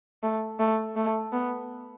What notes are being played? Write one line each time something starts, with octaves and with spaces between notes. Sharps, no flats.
A3
A3
A3
B3